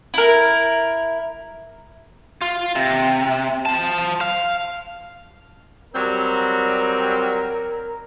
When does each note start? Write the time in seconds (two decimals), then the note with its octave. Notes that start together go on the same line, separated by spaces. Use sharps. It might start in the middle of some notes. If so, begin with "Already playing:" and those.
0.14 E4 A#4
2.41 F4
2.75 C3
3.66 C5 A5
4.21 F5
5.94 F#3 G3 C4 A#4